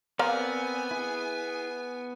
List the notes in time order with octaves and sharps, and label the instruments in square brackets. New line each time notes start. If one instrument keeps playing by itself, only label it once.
[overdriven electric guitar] B3 [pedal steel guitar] C4 D5 [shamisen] A#4 C5 F5 [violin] G#5
[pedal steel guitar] E4 G#4